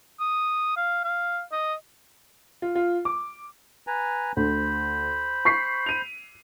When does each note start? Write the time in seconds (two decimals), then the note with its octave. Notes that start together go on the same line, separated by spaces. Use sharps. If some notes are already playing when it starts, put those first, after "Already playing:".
0.20 D#6
0.77 F5
1.04 F5
1.52 D#5
2.62 F4
2.75 F4
3.05 D6
3.87 B4 G#5 A#5
4.37 D2 C5 B5
5.45 C#6 B6 C7
5.86 D#7 F7